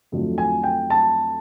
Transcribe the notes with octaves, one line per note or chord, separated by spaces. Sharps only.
F2 D3 F#3 A3
G#5
G5
A5